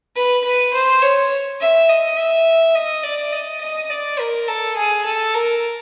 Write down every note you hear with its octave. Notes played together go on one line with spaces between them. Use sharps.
B4
B4
C5
C#5
E5
D#5
E5
D#5
D5
D#5
D#5
D5
A#4
A4
G#4
A4
A#4